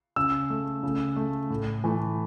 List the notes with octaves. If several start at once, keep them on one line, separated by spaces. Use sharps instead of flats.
C#3 E6
A3
C#3
A3
A2
E3 A3